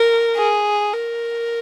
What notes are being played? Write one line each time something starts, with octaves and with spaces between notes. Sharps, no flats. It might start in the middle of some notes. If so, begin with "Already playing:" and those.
Already playing: A#4
G#4
A#4